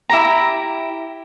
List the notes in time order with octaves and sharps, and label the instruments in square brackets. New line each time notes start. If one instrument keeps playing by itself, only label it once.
[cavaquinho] E4 G4 A#5